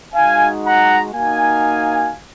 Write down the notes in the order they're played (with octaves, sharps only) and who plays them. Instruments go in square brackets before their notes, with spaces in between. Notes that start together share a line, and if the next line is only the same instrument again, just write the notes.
[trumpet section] G#3 D#4 F#4 F5 G#5
F#5 A#5
A#3 D#4 F#4 F5 G#5